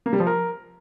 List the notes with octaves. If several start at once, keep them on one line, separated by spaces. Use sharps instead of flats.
A#3
G3
F3
A#4